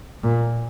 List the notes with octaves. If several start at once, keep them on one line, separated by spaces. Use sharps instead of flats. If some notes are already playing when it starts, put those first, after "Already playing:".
A#2